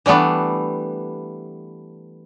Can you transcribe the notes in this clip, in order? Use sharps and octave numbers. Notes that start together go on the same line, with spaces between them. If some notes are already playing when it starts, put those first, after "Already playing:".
E3 G3 A3 B3 D4